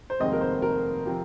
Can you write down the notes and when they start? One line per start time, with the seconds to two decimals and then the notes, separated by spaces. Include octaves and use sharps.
0.10 C5
0.20 F1 D#2 D#3 G#3 C4 D#5
0.32 A#4
0.41 C5
0.62 A#4
1.05 C3 F3 C4